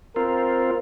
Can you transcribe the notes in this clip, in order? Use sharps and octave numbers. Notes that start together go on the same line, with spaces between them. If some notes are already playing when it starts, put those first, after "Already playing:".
C4 F4 A#4